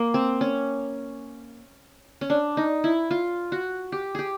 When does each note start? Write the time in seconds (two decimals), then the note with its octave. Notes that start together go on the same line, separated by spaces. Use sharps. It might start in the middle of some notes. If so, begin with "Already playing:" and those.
Already playing: A#3
0.14 C4
0.41 C#4
2.21 C#4
2.30 D4
2.57 D#4
2.84 E4
3.11 F4
3.52 F#4
3.92 G4
4.15 G4 G#4